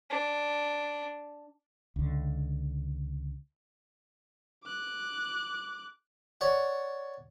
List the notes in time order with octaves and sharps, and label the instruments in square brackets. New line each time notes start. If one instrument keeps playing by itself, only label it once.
[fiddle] D4
[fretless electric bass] C#2 D3
[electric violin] D6 F#6
[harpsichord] C#5 D5 F#5